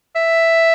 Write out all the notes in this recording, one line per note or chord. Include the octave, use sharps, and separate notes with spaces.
E5